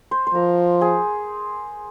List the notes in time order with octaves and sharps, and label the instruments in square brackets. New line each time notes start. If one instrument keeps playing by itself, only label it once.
[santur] C5
C5
[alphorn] F3 [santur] A#4
[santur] G#4